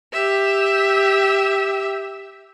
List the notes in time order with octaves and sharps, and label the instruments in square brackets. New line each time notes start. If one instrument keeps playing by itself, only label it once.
[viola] G4 E5